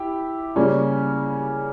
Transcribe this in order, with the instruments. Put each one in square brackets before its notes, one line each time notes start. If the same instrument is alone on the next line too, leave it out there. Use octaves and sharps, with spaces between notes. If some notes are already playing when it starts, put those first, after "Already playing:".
Already playing: [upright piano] E4 G4
C#3 G3 A#3 C#4